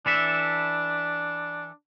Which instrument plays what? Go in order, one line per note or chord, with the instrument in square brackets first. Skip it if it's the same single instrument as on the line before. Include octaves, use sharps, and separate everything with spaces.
[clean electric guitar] E3 A4 E5 [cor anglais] D4